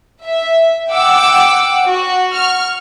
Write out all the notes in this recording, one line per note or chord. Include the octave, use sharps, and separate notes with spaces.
E5
F#5 G5 D6 E6
F#4
C#6 F6